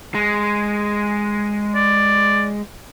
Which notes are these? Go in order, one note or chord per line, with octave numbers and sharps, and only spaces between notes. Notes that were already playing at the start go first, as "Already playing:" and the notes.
G#3
D5